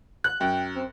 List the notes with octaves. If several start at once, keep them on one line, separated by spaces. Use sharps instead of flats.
F#6
F#2 G5
C4